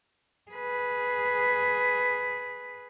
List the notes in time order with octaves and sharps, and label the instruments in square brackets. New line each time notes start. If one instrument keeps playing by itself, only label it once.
[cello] G#4 B4